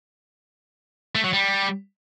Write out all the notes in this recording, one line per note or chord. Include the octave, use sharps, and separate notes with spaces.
A3
F#3
G3